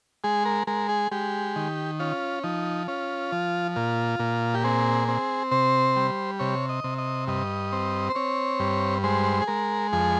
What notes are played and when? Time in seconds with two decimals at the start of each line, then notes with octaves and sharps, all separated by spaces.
0.24 G#3 G#4
0.45 A#4
0.67 G#3 A#4
0.89 G#4
1.11 G#3 G4
1.56 D#3
2.00 C#4 F4
2.43 F3 D#4
2.88 C#4 F4
3.32 F3
3.76 A#2 F4
4.19 A#2
4.54 G4
4.64 C4 G#4
5.08 C4
5.52 C3 C5
5.96 G3
6.39 C3 C#5
6.69 D#5
6.84 C3
6.98 D#5
7.27 G2 D#5
7.72 C4
8.10 C5
8.15 C4 C#5
8.60 G2
9.04 G#3 C5
9.42 G#4
9.48 G#3 A#4
9.93 F2 G#4